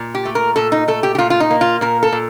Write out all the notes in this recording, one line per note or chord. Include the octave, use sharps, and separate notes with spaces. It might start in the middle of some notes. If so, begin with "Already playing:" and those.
Already playing: A#2
G4
A3
A#4
A#2 A4
D#4
A3 A4
G4
G4
A#2 F4
F4
D#4
A#3
F4
A#2 A#4
A4
A#2